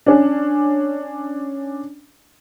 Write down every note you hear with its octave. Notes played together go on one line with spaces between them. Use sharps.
C#4 D4